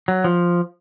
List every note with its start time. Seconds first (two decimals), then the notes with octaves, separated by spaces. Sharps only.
0.08 F#3
0.24 F3